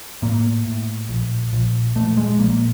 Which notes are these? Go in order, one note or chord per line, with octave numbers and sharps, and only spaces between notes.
A2 A#3
A2
A#1
A#1
A#1 A3
G#3
A#1 A#3